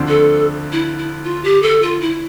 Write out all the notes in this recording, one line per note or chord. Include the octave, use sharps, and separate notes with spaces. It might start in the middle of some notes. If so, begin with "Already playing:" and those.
Already playing: D2 D3 F3 C4
A4
E4
E4
F4
G4
A4
F4
E4